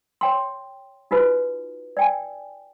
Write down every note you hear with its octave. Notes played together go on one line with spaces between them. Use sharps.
C#5 G5 C6
D#4 F4 F#4 B4
D5 G5 G#5